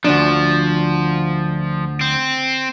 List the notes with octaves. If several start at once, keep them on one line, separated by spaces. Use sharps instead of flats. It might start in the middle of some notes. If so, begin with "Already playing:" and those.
D2 F3 D4
C4